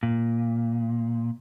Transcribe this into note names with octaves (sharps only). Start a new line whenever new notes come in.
A#2